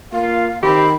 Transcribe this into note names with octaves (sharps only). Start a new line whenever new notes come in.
A#3 F4 F5
D#3 C4 G4 B5